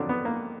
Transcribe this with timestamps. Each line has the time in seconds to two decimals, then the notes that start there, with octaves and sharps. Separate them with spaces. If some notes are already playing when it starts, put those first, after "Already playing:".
Already playing: F2 D3 D#3 F#3 D4
0.09 B3
0.25 A#3